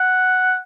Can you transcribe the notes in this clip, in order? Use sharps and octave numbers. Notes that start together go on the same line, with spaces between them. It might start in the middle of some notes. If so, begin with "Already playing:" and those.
Already playing: F#5